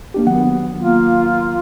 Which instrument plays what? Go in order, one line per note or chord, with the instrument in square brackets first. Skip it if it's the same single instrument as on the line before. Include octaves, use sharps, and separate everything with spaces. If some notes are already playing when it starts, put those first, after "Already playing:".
[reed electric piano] A#3 D4 G4
[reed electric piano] D#3 F#3 F#5 [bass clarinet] B3
[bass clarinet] A#3 [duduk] F4